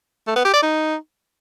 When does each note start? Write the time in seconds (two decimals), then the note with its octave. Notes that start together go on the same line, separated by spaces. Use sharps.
0.27 A3
0.36 B3
0.45 G4
0.54 D5
0.63 D#4